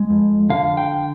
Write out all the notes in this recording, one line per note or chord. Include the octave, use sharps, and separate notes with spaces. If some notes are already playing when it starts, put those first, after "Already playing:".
Already playing: G#3
F2
D3 F5
G5